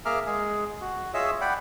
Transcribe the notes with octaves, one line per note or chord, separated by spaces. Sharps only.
A#3 G#4 E5 A#5 D6 F6
G#3 G#4
F#4
F4 G#4 C#5 D#5 E5 E6
D5 F#5 G5 B5